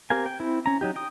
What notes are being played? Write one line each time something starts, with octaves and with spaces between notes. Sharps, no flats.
C4 G4 A#4 F5 G#5
G5
C4 E4
C#4 A#5
F#3 D#4 G4
G5 D#6